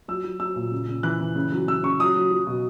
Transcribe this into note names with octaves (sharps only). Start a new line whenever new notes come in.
F#3 E6
F#3
F#3 E6
A#2
C#3
C#3
E3 F#6
E3
C#3
F#3
C#3 E6
C#3 C#6
F#3 D#6
F#3
F#3
B2